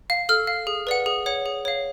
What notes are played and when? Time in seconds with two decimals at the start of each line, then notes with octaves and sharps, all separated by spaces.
0.10 F5
0.29 A4 F6
0.47 F5
0.67 G#4
0.87 B4 D5 F#5
1.06 G#4
1.26 C#5 F#5
1.46 G#4
1.65 C#5 F5